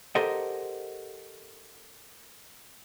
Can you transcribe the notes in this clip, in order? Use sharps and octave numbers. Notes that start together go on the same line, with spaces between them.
G4 A4 A#4 C5 D#5 F#5